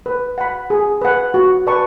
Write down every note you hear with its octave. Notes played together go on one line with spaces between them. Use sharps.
B4
F#5 B5
G#4
B4 F#5
F#4
B4 D5 A5 C#6